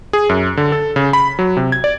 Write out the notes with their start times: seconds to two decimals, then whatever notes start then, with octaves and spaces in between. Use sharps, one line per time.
0.13 G#4
0.29 F#2
0.57 D3
0.72 A4
0.96 C#3
1.13 B5
1.39 F#3
1.57 C3
1.72 G#6
1.84 D5